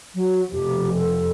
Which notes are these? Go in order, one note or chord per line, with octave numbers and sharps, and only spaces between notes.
F#3
F1 F2 B2 G4
A4